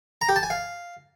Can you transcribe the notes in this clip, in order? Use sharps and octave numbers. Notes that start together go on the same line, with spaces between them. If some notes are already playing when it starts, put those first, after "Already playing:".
A#5
G4
A5
G#5
F5